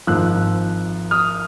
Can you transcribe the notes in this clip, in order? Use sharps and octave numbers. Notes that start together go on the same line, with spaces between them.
G#1 G#2 F3 E6 F#6
D#6 F6